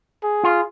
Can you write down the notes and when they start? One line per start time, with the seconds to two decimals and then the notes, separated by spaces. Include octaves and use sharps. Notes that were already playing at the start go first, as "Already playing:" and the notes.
0.24 G#4
0.43 F4